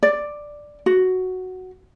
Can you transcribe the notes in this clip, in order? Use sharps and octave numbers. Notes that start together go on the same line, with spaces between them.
D5
F#4